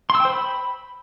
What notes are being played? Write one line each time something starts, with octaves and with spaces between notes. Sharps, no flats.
C6
E6
G5
C5
B5